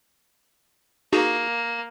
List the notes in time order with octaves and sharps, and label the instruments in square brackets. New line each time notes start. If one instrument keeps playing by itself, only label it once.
[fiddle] A#3 [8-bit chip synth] D#4 F#4 G#4